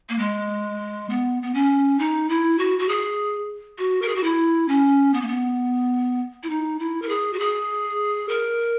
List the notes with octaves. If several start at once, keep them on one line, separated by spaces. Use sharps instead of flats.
A#3
G#3
B3
B3
C#4
D#4
E4
F#4
F#4
G#4
F#4
A#4
G#4
F#4
E4
C#4
B3
A#3
B3
E4
D#4
E4
A#4
G#4
F#4
G#4
A#4